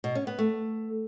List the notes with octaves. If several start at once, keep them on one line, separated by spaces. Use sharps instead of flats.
B2
C#4
B3
A3